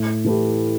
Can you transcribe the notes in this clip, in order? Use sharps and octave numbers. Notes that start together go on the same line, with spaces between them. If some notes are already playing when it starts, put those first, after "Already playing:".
Already playing: A2
E3 A3 E4 G4